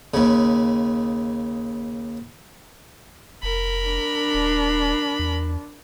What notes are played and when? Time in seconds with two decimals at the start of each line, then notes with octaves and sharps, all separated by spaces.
0.14 D#2 C#3
3.43 F1 A#4 B5
3.86 D4
4.34 D#1
5.19 E2